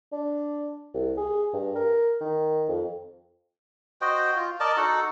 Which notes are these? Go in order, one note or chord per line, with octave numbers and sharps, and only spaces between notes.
D4
C2
G#4
G2
A#4
D#3
F2
F#4 C5 D#5 G5
F4
A#4 D5 D#5 A5
D#4 F#4 A4 F#5